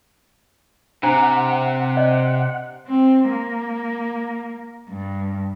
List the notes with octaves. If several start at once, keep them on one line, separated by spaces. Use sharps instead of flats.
C3 D4 C5 F#5 A#5
D5 D#5
C4
A#3
G2